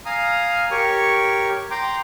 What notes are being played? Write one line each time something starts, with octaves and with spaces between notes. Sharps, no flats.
F5 G#5 A#5 D#6 F6
G4 A#4 C#5 C#6
G5 A#5 C6 D6